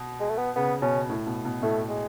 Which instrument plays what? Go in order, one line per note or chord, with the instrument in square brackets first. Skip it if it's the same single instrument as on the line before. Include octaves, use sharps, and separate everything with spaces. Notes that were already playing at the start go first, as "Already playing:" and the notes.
Already playing: [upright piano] B2
[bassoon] G#3
A3
B3
[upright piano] C#3 [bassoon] B3
[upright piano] B2 [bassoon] C#4
[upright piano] A2
B2
B2
[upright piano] A2 [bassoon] A3
[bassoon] G#3